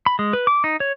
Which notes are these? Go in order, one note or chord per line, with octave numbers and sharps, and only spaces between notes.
B5
G#3
B4
D6
D#4
C#5